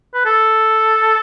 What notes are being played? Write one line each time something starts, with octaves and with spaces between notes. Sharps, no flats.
B4
A4